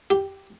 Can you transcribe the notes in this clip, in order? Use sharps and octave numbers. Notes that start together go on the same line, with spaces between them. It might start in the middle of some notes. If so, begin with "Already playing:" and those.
G4